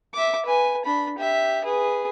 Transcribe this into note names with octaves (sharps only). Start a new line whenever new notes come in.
E5 D6
B4 G#5
D4 B5
G4 E5
G#4 B4